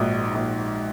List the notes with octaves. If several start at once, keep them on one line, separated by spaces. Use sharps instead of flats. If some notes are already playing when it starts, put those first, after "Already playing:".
Already playing: A#1 G#2 F#4
A#1